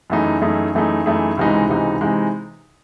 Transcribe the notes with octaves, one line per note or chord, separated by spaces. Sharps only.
F#2 E3 A3 D#4 G#4
F#2 E3 A3 D#4 G#4
F#2 E3 A3 D#4 G#4
F#2 E3 A3 D#4 G#4
C#2 C3 E3 G#3 D#4
C#2 C3 E3 G#3 D#4
C3 E3 G#3 D#4